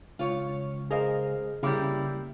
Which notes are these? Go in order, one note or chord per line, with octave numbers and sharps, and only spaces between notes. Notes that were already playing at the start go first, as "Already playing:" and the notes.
C#2 F4 C#5
G#4 A#4 C5 D#5 F5
C#3 G3 A#3 E4 G4 D6